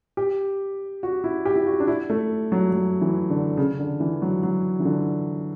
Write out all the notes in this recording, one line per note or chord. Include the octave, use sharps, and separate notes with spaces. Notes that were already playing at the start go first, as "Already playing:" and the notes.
G4
F#4
E4
G4
E4
F#4
D4
E4
A3
F#3
F#3
E3
D3
C#3
D3
E3
F#3
F#3
E3
D3